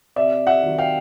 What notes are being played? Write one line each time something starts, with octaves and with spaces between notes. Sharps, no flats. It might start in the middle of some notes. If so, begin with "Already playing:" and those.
C3 D5 E5
E5 F#5
D#3 F#3
F5 G5